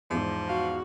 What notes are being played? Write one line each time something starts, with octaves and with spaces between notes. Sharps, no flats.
E2 G#2 F3
F#4 F5